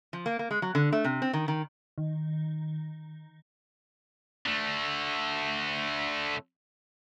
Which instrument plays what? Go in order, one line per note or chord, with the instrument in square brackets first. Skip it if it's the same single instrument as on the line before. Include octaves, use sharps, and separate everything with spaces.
[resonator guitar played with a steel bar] F3
A#3
A#3
G#3
F#3
D3
A3
C3
C4
D#3
D#3
[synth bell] D#3
[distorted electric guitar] D3 A3